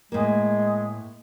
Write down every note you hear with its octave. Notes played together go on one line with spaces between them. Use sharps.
A2 G#3 A#3